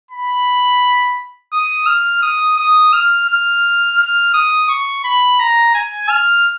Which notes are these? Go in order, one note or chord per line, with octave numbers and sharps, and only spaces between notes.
B5
D#6
F6
D#6
D#6
F6
F6
F6
D#6
C#6
B5
A#5
G#5
F6